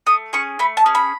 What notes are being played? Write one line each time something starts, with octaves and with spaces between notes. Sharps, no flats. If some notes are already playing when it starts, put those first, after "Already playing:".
A3 D#6
C#4 G#4 C#6
A3 B5
A5
C#4 G#4
B5